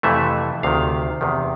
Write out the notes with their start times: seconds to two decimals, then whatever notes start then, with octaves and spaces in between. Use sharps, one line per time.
0.03 F2 C3 E3 A3 E5
0.63 D2 C3 D#3 F5
1.21 E2 C3 D#3